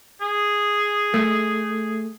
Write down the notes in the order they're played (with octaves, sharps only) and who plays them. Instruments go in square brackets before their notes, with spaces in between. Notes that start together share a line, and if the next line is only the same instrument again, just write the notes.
[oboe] G#4
[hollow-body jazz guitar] A3